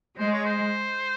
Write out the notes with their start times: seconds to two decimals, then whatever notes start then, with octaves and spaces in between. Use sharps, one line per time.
0.19 G#3 C5
0.32 C#5
0.45 C5